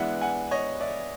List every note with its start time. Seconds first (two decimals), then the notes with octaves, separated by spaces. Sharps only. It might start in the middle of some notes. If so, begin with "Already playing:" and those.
Already playing: E3 G#3 B3 D4 E5 F#5
0.21 F#5 G#5
0.51 C#5 D#5
0.80 D5 E5